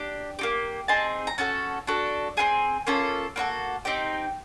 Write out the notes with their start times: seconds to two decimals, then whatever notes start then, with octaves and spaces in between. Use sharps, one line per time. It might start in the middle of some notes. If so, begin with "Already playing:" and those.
Already playing: D4 G4
0.39 A#3 D#4 G4
0.88 C4 D#4 G#4 A5
1.27 A#5
1.38 C#4 F#4 A4 A5
1.87 D4 F#4 A4
2.37 C4 F4 G#4 G#5
2.87 A#3 C#4 F4 A4
3.36 A#3 D#4 F#4 A4
3.85 C4 D#4 G4 G5